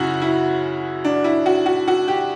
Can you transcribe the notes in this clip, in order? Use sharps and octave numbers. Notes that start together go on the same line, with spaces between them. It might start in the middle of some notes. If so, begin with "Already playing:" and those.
Already playing: F#2 C#3 E4 F#4
E4
D4
E4
F#4
F#4
F#4
G4